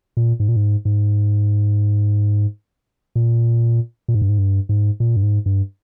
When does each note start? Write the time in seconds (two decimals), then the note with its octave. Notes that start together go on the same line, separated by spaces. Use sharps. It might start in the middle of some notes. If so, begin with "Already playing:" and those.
0.17 A#2
0.40 G#2
0.48 A#2
0.56 G#2
0.85 G#2
3.16 A#2
4.08 A#2
4.14 G#2
4.22 G2
4.29 G#2
4.38 G2
4.69 G#2
5.00 A#2
5.16 G2
5.23 G#2
5.46 G2